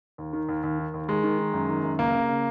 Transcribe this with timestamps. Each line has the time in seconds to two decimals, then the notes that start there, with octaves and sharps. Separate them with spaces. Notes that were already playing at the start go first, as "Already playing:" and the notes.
0.18 D#2
0.33 D#3
0.49 D#2
0.63 D#2
0.79 D#3
0.94 D#2
1.08 D#3 G#3
1.23 D#3
1.39 D#3
1.54 F#2
1.69 D#3
1.84 F#2
1.99 C#2 A#3
2.14 C#3
2.29 C#3